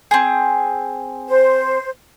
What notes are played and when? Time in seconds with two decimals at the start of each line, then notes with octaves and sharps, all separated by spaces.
0.11 C4 G#4
1.28 C5